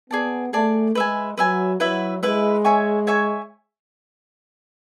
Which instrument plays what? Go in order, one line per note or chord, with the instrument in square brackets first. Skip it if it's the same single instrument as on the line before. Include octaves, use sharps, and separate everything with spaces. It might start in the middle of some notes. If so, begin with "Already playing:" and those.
[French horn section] B3 [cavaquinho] G#4 D5 A5
[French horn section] A3 [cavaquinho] G#4 D5 A5
[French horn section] G#3 [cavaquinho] B4 E5 G#5
[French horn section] F#3 [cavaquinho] B4 E5 G#5
[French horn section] F#3 [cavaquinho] E4 B4 E5
[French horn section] G#3 [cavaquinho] E4 B4 E5
[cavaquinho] C#5 E5 G#5 C#6
C#5 E5 G#5 C#6